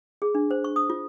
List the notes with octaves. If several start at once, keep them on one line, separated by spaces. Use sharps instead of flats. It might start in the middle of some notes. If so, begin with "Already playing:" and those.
G#4
D4
C5
C#6
D#6
F4